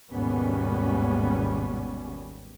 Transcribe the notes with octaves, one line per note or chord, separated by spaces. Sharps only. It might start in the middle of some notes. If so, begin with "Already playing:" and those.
G#1 D#2 B2 G3 B3 C#4